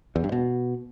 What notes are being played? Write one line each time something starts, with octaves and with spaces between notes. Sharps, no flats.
E2
G2
B2